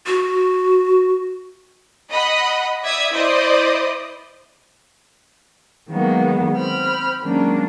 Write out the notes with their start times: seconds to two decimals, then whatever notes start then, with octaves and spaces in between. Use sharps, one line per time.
0.06 F#4
2.12 D#5 F#5 B5 D#6
2.82 D5 E5 D#6 G#6
3.12 E4 C5 D5 D#5 D#6
5.89 D#3 F#3 G#3 A#3 B3
6.54 C4 B5 F6
7.21 D#3 F#3 G#3 A#3 C#4 D4